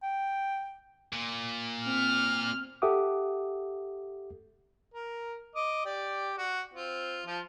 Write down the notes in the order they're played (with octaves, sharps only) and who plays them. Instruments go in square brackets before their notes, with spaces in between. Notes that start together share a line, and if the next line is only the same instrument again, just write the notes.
[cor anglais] G5
[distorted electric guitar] A#2
[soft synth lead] C4 [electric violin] F6
[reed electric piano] G4 A4 E5 F#5 D6 D#6
[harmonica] A#4
D#5 D6
G4 D5
F#4
C4 F4
F3 F4